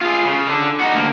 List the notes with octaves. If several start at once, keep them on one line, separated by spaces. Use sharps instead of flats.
F4 G#4
C#3
D3
D#4 F#4
D2 A#3